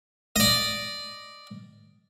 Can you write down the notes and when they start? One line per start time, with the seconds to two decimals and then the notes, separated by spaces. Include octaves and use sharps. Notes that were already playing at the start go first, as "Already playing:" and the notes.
0.36 D5 D#5